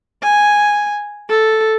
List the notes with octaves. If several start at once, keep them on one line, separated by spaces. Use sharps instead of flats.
G#5
A4